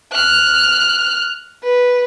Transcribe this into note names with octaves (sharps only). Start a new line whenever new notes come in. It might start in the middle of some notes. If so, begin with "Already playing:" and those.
F6 F#6
B4